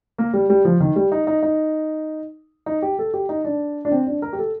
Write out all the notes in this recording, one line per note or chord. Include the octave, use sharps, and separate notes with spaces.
A#3
G3
G3
F3
D#3
G3
D#4
D#4
D#4
D#4
G4
A4
G4
D#4
D4
D4
C4
D4
A#4
G4
A4